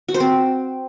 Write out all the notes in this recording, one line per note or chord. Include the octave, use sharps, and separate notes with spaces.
F#4
C5
C4